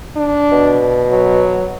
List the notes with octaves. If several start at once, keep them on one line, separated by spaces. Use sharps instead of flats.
D4
B2
F#3